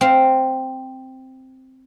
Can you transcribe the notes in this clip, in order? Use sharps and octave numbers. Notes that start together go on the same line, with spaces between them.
C4 F5